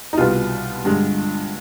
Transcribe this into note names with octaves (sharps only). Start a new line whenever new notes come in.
D#4
C2 B2 G3 B3 F4
G2 D3 G#3